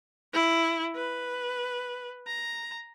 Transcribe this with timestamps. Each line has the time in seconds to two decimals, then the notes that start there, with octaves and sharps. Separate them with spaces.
0.33 E4
0.95 B4
2.27 A#5